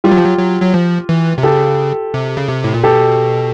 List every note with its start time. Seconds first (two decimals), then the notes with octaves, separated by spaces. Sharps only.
0.04 G3 F4 G4
0.12 F#3
0.17 F3
0.24 F#3
0.39 F#3
0.62 F#3
0.74 F3
1.09 E3
1.38 C3
1.43 C#3 G4 A4
2.14 C3
2.37 C#3
2.49 C3
2.64 A2
2.74 A#2
2.84 B2 G4 A4